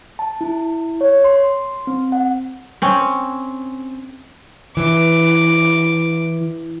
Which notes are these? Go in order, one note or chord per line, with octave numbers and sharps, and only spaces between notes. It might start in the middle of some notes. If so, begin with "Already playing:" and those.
A5
E4
C#5
C6
C4
F#5
C4 C#4
E3 D6